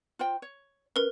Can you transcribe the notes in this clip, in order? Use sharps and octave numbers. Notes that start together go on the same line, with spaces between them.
F4 C5 G5
C#5
C#4 A#4 B4